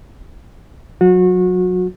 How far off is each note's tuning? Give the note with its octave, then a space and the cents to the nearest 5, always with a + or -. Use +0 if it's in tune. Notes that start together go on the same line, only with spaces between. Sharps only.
F#3 -20 F#4 -30